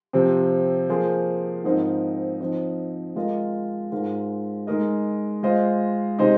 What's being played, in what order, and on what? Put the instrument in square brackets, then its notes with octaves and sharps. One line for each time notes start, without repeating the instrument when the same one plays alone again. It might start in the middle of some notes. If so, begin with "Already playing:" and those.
[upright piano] C3 F3 C4
F3 A#3 G#4 C5
G#2 F3 C4 D#4 A#4
F3 C4 D#4
G#3 F4 A#4 D#5
G#2 G#3 F4 A#4
G#3 D#4 A#4 D#5
G#3 F4 C5 D#5
C3 G#3 D#4 C5 D#5